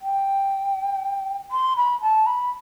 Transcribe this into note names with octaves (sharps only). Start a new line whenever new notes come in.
G5
C6
B5
A5
B5